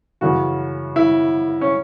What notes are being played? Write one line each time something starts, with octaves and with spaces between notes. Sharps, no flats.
F#2 C#3 E3 F#4
E4
C#4